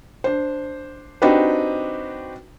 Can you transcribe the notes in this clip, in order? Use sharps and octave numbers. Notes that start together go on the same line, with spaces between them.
D4 C5
C4 D4 D#4 F#4 G4 B4